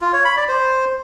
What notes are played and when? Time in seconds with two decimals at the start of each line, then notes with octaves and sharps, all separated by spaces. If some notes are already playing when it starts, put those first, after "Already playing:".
0.01 F4
0.13 C#5
0.25 B5
0.37 D5
0.48 C5